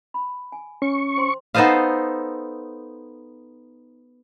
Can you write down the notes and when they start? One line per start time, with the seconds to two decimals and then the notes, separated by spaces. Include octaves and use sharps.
0.14 B5
0.52 G#5
0.82 C#4 C#6
1.17 C5 G5 C6
1.55 B3 D#4 A4 C5 D#5 F5